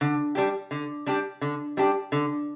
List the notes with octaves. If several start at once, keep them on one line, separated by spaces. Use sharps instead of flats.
D3
G3 D4 G4
D3
G3 D4 G4
D3
G3 D4 G4
D3